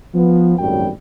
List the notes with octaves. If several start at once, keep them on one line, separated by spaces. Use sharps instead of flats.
F3 B3
G#1 F#2 A2 F#3 G3 G5